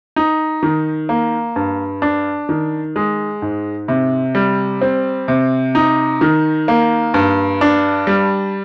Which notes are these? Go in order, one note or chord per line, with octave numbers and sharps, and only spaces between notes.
D#4
D#3
A#3
G2
D4
D#3
G#3
G#2
C3
G3
C4
C3
D#4
D#3
A#3
G2
D4
G3